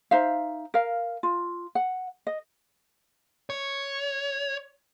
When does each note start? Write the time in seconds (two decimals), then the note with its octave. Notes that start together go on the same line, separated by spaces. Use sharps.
0.11 D#4 C5 E5 F5
0.74 A#4 F5
1.23 F4
1.75 F#5
2.27 D#5
3.50 C#5